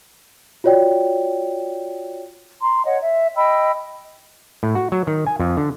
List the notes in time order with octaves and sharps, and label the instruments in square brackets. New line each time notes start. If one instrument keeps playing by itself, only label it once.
[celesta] F4 F#4 C#5 D5 G5
[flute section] A#5 C6
C#5 D#5 F#5
E5
D#5 G5 B5 E6
[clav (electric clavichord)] A2
F#4
F#3
D#3
G#5
F2
D3